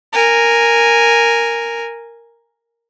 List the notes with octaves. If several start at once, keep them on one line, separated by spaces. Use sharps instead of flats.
A#4 G#5